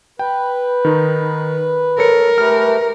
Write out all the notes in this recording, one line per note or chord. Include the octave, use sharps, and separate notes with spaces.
B4 G5
D#3 D#4
A4 A#4 C#5 C#7
A3 G4 B4 F6